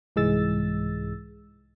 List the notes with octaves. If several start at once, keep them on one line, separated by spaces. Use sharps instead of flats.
C2 G#2 E3 G#3 E6 A6